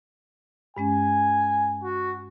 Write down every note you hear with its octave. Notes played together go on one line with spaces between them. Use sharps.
G2 G#3 C#4 G#5
F#4